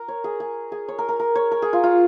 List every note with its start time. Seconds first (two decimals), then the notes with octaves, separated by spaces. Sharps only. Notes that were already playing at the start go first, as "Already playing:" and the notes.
Already playing: A#4
0.08 C#5
0.24 G#4
0.40 G#4
0.72 G#4
0.88 C#5
0.99 A#4
1.09 A#4
1.20 A#4
1.35 C#5
1.51 A#4
1.62 G#4
1.73 F4
1.84 F4